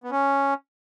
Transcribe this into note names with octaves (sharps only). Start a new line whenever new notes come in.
B3
C#4